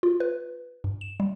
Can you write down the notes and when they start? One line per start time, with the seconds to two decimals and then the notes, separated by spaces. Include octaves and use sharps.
0.03 F4
0.20 B4
0.84 G2
1.01 E7
1.20 G3